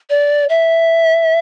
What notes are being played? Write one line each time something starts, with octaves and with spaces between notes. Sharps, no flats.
D5
E5